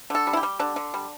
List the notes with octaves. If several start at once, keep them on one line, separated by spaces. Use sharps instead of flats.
D3 A4
G3
E4
G4
G3
D3 D4
D3
G3